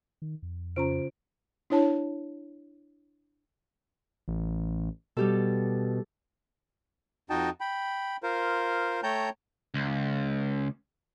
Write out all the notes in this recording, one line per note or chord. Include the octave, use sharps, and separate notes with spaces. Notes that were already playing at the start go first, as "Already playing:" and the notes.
D#3
F2
C#3 C#4 F4 C5 A#5 D7
D4 E4 C#5 A5
A1
B2 G3 G4 A4
F2 D#4 F#4 D#5 G5 A5
G5 B5
F4 A#4 C5
A3 C#5 G5 A5 A#5 G6
C#2